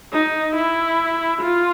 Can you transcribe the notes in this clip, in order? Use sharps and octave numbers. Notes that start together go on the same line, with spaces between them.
D#4
E4
F4